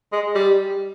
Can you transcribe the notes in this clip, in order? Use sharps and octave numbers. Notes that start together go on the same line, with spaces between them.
G#3
G3